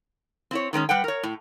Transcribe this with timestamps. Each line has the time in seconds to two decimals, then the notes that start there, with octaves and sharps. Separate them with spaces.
0.51 C4 E4 C#5
0.73 D#3 G#3 C4 C#4
0.89 G3 B4 F#5 G5
1.04 A#4 C#5
1.23 A2